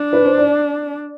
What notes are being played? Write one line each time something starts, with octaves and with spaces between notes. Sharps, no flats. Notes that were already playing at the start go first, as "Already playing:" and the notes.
Already playing: D4
B4
C5
D5